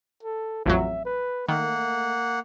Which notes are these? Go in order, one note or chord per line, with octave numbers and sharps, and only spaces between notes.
A4
A1 F2 F#3 E5
B4
D#3 A3 A#3 F#5